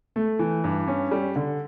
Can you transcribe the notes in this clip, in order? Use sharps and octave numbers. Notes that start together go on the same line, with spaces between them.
A3
E3
G2
C#4
G3
D3